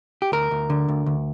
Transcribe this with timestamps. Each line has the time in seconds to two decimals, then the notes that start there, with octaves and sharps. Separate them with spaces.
0.22 G4
0.32 D2 A#4
0.51 D2
0.70 D3
0.88 D2
1.06 D2